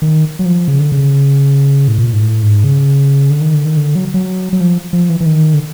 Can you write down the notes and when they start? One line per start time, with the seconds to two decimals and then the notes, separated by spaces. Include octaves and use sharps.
0.02 D#3
0.39 F#3
0.45 F3
0.68 C#3
0.79 D3
0.92 C#3
1.88 A2
1.98 A#2
2.13 G#2
2.20 A2
2.43 G#2
2.64 C#3
3.30 D3
3.41 D#3
3.54 D3
3.65 D#3
3.77 D3
3.95 F#3
4.14 F#3
4.53 F#3
4.61 F3
4.93 F3
5.09 E3
5.20 E3
5.26 D#3
5.54 D3